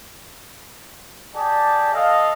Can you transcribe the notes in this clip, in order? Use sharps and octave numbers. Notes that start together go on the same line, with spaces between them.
G4 G#4 D5 A5
A4 D#5 F5